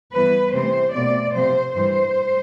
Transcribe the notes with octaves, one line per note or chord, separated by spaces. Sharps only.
G2 E3 B3 B4
C3 E3 A3 C4 C5
B2 A3 C4 D5
C3 F3 C4 C5
G2 E3 G3 C5